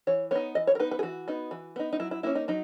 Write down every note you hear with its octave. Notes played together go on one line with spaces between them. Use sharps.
E3 C#5
B3 D#4 C#5
E3 D#5
C#5
A#4
B3 D#4 B4
B4
G#4
E3 F#4
B3 D#4
E3
B3 D#4
D#4
F#3 E4
E4
A#3 C#4 E4
D#4
F#3 D#4